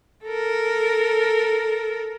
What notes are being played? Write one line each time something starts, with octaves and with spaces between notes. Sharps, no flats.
A4 A#4